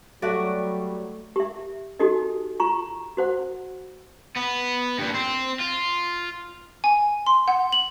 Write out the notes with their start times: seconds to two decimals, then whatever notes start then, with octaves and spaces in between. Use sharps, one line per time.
0.22 F#3 G3 A3 F#4 D5
1.36 G4 E5
2.00 D#4 F#4 G4 A4 D#5
2.60 F4 A#5 C#6
3.17 F#4 C5 F#5
4.36 B3
4.99 G2 A#2
5.15 C4
5.60 F4
6.84 G#5
7.26 C6
7.48 F#5
7.73 F#7